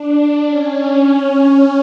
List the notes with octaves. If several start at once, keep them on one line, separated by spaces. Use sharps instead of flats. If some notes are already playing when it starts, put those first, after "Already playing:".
Already playing: D4
D4
C#4